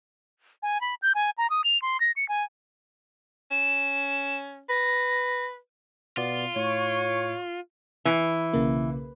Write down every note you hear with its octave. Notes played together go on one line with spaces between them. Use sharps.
G#5
B5
G6
G#5
A#5
D#6
F7
C6
A#6
C#7
G#5
C#4 E7
B4 A#6
B2 B3 F4 D5
A2 C#5 C#6
E3
B1 C#3 A#3